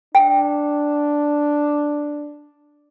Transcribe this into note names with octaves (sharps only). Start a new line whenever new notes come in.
D4 G5